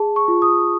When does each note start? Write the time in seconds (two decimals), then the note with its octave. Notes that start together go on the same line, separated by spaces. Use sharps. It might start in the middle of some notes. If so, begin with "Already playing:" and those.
Already playing: G#4 A5
0.16 C#6
0.28 F4
0.42 D#6